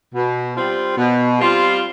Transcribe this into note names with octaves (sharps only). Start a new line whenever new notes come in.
B2
G3 C4 F4
B2
G3 C4 F4